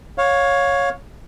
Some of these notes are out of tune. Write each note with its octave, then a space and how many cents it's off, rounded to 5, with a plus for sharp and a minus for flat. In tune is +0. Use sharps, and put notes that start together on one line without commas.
C#5 +0 F5 +25